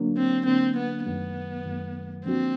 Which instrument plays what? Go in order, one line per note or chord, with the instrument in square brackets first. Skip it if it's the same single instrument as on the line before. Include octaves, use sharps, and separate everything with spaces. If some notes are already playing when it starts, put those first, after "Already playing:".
Already playing: [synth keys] D3 F#3 A#3 D4
[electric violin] C4
[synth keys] D3 F#3 A#3 D4 [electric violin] C4
[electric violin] B3
[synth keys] F#2 D#3 F#3 A3 [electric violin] B3
[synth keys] F#2 D#3 F#3 A3
[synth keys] D3 F3 A#3 D4 F#4 [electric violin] C4